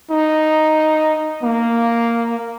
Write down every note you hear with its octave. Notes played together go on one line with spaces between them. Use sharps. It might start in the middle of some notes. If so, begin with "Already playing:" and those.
D#4
A#3